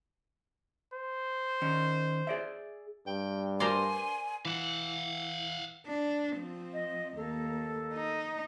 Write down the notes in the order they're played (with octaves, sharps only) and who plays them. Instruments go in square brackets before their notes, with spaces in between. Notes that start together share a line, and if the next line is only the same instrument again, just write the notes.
[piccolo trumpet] C5
[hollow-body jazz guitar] D#3 C#4
G#4 D5 E5
[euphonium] G2 [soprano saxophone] G5
[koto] A#4 C5 D5 [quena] G#5 [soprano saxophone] C6
[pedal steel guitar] E3 [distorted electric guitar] F5 F#5
[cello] D4
F3 C4
[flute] D#5
[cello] D#2 A#3 [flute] A4
[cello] D#4